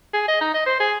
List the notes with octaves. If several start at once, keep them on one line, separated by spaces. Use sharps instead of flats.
G#4
D#5
D#4
D#5
C5
G#4